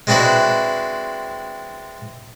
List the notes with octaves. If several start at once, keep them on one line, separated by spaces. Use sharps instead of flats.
G#3 C4 D4 E4 F#4 B4